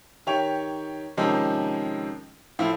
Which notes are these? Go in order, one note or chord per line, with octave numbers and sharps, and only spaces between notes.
D#3 G4 C#5 G5 F7
C3 D#3 F3 G#3 C#4
A2 F3 E4 F4